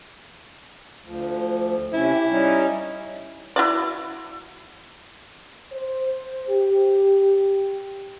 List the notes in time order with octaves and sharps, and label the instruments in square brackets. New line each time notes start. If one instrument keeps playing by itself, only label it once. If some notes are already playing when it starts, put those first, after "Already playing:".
[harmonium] D2 F3
[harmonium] C3 C#4 [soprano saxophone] E4
[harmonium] G4
G3 C#4 D#4
[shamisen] E4 F#4 D5
[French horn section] C5
G4